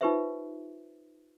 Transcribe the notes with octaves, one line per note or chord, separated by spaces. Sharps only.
D#4 F4 G4 B4 C5 E5